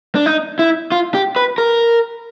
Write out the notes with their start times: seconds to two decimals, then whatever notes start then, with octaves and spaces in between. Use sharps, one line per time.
0.15 D4
0.26 D#4
0.59 E4
0.92 F4
1.14 G4
1.36 B4
1.58 A#4